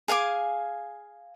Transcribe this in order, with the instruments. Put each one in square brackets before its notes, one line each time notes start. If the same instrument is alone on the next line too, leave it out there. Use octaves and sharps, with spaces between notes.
[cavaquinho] G#4 F5 G#5 D6